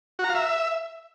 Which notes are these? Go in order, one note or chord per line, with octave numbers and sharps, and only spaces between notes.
F#4
A#5
F5
E5